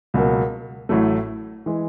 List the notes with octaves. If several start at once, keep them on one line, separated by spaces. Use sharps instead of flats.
C#2 B2 F#3 A#3
A1 A2 F#3 A3
E3 G#3